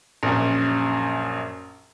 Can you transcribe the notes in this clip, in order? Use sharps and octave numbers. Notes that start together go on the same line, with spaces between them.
A#1 F#2